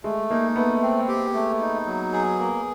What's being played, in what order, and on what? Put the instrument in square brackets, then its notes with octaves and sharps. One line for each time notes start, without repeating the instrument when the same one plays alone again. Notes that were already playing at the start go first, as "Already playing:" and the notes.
[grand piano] G#3 [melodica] A3
[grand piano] A#3 [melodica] D#4
[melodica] A3 [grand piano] B3
[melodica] C4
G4
A3
D#4
F#3
G#4
A#3